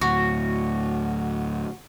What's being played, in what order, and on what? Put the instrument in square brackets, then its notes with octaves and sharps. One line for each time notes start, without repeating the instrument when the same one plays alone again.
[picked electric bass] D2 A2 [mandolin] F#4